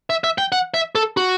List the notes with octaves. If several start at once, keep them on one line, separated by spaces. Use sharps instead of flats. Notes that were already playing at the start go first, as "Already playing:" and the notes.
E5
E5
G5
F#5
E5
A4
F#4